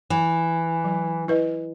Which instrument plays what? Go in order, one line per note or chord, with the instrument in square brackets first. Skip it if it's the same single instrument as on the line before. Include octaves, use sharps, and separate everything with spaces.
[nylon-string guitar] E3
[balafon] F#3
E4 B4 D#5